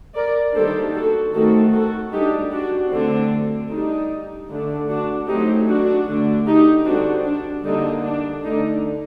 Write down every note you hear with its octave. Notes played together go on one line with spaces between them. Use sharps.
A#4 D5
D#3 G3 A#3 D4 A4 C5
F#4 A4
D#3 A3 C4 F#4 A4
F#4 A4
G3 D4 D#4 G4
D4 F#4
D3 A3 C4 D4
G3 D4 D#4
D3 A3 D4
D4 F#4
F#3 A3 C4 D#4 G4
D4 F#4
D3 A3 D4
D#4 G4
D3 G3 C4 D4 F#4
D4
D3 G3 A#3 D4 D#4
D4
D3 A3 D4 D#4